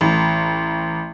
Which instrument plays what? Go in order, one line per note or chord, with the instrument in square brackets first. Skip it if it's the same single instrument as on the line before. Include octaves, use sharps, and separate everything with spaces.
[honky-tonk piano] A1